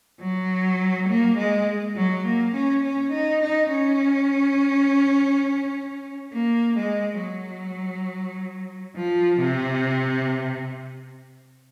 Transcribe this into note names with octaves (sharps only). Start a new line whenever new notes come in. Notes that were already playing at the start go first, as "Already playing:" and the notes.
F#3
A#3
G#3
F#3
A#3
C#4
C#4
D#4
D#4
C#4
A#3
G#3
F#3
F3
C3